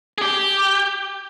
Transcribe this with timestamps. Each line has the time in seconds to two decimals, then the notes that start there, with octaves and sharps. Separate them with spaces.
0.18 G#4
0.22 G4